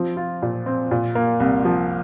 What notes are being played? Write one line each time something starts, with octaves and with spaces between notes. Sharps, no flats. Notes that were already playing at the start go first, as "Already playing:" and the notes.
Already playing: F3 C4
F4
A#2
C4
A#2
A#3
C2
F3